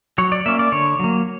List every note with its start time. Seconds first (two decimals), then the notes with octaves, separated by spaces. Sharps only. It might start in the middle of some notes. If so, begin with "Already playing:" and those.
0.18 F#3 C#5
0.32 D5
0.46 A#3 C#4 E5
0.59 D5
0.72 D3 C#5
1.00 F#3 A#3